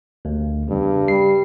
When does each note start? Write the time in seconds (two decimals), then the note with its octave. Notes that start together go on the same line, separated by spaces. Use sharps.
0.25 D2
0.69 E2 G2 C#3
1.08 G3 C7